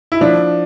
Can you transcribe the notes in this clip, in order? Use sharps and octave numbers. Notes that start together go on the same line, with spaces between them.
E4
F3 D4